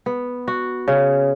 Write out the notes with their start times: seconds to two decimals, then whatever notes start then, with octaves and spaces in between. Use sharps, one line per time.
0.06 B3
0.48 F#4
0.88 C#3